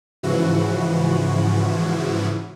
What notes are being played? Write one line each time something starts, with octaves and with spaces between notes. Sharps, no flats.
G#2 C#3 E3 F3 E4 F#4